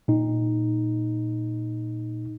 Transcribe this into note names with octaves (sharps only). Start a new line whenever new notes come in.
A#2 D#4